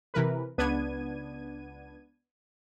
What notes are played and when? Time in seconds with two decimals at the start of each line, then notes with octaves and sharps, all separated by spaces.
0.14 C3 E3 A#4 B4
0.58 C#2 B3 D4 G#6 D#7